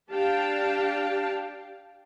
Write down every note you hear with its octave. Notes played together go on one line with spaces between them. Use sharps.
D4 G4 F5 G5 A5